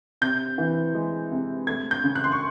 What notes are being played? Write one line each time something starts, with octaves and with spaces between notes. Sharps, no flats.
C3 G6
E3
G#3
C3
A3 G#6
G6
C#3
F#6
C6
C#6